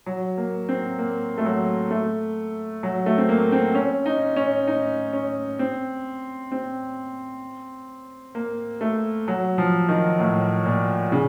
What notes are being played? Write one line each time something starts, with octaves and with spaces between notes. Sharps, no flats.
F#3
A#3
C4
A#3
A3
F#3
A3
F#3
A3
C4
A#3
C4
C#4
D#4
C#4
D#4
C#4
C4
C4
A#3
A3
F#3
F3
D#3
A2
A#2
C#3